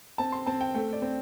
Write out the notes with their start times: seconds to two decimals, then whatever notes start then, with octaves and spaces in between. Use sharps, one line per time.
0.18 C4 A5
0.32 C6
0.46 C4 A5
0.61 G5
0.75 A3 G5
0.93 D5
1.02 C4